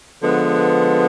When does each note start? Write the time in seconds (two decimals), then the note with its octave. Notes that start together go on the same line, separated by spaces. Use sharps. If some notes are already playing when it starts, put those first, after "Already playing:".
0.22 D3 F3 G#3 B3